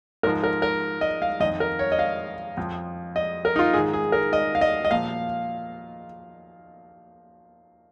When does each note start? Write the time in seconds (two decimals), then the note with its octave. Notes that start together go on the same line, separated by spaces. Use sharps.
0.23 G#2 A#4
0.27 F3
0.43 A#4
0.62 A#4
1.01 D#5
1.22 F5
1.40 F2 D#3 D#5
1.60 A#4
1.79 C#5
1.92 D#5
1.99 F5
2.57 F2 F3
3.16 D#5
3.45 A#4
3.56 D#4
3.59 F4
3.73 G#2 D#3 G#4
3.93 G#4
4.12 A#4
4.33 D#5
4.55 F5
4.61 D#5
4.85 D#5
4.91 A#2 F3 F5